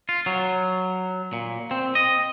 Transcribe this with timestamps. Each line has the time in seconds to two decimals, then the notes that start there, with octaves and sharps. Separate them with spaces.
0.09 F4
0.26 F#3
1.33 A#2
1.71 C4
1.95 D#5